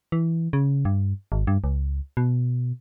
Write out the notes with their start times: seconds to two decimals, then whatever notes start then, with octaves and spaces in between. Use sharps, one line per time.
0.12 E3
0.53 C#3
0.85 G2
1.32 G#1
1.47 G2
1.64 C#2
2.17 B2